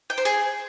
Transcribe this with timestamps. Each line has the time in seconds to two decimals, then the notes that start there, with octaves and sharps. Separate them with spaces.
0.10 G5
0.18 C5
0.25 G#4